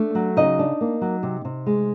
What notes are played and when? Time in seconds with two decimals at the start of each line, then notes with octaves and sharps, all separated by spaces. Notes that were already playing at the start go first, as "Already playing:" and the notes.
Already playing: A3 D4 D5
0.15 F#3
0.37 C#3 D#4 D#5
0.59 D4
0.81 A#3
1.01 F#3
1.23 C3
1.45 C3
1.66 G#3